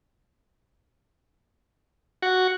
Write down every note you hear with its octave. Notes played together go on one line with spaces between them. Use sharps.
F#4